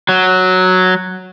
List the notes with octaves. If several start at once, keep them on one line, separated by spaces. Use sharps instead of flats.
F#3